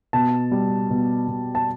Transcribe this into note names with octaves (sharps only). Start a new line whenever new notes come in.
B2 A5
G3
B2
B2
A5